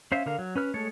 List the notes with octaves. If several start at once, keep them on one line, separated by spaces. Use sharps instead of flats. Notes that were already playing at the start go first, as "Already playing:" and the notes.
C#4 C5 E5 F5
D3 A#4 F5
F#3
C#4 B4 F6
G#3 A3 A4 C#5